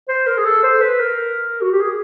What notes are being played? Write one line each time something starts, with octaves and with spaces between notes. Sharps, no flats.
C5
A#4
G#4
A4
C5
B4
A#4
F#4
G4
G#4